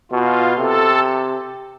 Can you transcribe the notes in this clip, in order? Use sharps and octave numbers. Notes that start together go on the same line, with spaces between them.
B2 F4
C3 A4